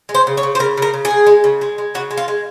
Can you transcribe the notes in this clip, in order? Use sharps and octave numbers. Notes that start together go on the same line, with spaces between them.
G#3
C5
C#3
C#5
C#3
C5
C#3 A#4
C#3 A#4
C#3
G#4
C#3
G#3
C#3
G#3
G#3
C#3 F#4
G#3
F4
G#3